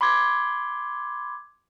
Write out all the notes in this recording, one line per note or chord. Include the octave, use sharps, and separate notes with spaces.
B5 C6 D6 G#6